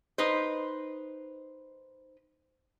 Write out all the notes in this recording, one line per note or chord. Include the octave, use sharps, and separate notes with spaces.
D#4 B4 C5